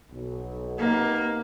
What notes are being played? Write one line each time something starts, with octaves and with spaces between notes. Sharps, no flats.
B1
C3 A#3 B3 D#4